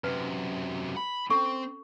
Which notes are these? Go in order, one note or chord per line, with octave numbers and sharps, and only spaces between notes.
F#2 C3 B4
B5
C4 C#4 A4 C#6